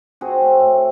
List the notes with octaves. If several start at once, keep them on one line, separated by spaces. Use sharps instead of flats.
C4 F#4 G#4
A3
A2